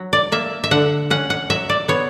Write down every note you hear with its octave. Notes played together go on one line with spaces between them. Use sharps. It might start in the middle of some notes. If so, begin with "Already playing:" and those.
Already playing: F#3
D5
A#3 E5
E5
D3 F#5
C#4 F#5
F#5
F#3 E5
D5
B3 C#5